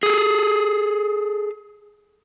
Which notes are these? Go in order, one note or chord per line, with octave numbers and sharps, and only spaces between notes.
G#4 A4